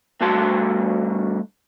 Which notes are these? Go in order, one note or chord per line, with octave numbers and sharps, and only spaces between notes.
G2 D3 A3 F#4 A5 C6